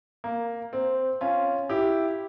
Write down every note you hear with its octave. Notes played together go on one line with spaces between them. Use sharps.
A#3
C4
C#4 F4
E4 G4